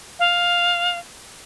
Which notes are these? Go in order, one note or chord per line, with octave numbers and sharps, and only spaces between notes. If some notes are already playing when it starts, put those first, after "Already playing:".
F5